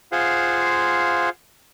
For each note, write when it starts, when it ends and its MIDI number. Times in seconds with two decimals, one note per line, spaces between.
0.12 1.29 65
0.12 1.29 68
0.12 1.29 72
0.12 1.29 77
0.12 1.29 78